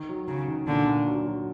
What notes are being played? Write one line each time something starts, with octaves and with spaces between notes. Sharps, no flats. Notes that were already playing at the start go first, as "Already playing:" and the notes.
Already playing: D#3
F#3
C#3 F#3
D#3
A#2 D3
A#2
F#3
F#3